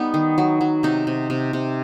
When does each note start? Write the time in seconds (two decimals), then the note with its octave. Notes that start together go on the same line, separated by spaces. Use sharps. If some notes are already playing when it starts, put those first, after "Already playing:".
Already playing: G3 B3 D#4
0.14 D#3
0.38 F#3
0.61 F#3
0.83 C3 D#4
1.07 C3
1.30 C3
1.53 C3